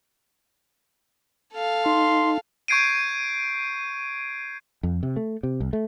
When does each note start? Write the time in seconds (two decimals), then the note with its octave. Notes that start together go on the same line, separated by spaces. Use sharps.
1.53 A4 F5
1.86 D#4 C6
2.68 C#6 G6 G#6 C7 D7 D#7
4.83 F2
5.03 C3
5.16 A3
5.43 C3
5.60 C2
5.73 A3